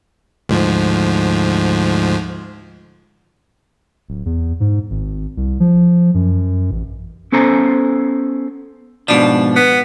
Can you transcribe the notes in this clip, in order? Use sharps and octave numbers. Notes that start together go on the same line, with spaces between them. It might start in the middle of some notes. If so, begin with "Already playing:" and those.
D2 G#2 F3
D1
E2
G#2
G#1
C2
F3
F#2
A1
B3 C#4 A4 C5 G#5 A#5
G#2 B2 F3 D4
B3